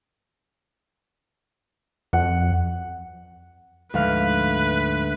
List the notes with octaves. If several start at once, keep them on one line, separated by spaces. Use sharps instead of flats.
F2 F#5
D2 G#2 F3 B4 F5